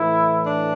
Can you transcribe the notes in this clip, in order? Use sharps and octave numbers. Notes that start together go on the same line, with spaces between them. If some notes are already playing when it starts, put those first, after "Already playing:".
Already playing: A2 E3 E4
D4